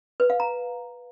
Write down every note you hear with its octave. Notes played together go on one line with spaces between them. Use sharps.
B4
F5
A#5